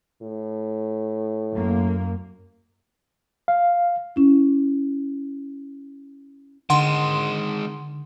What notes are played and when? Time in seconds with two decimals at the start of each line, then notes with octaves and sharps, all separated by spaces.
0.22 A2
1.53 F#2 A#3
3.48 F5
4.16 C#4 E4
6.70 D3 D#3 G#3 F#5 C6